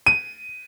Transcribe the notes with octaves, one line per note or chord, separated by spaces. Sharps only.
D#7